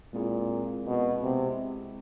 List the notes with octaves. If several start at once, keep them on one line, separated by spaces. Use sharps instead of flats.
A#2 G#3 C4 E4 G#4
B2
C3